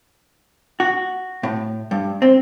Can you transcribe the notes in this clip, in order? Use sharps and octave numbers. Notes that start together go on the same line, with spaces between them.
F#4
A2
G2
C4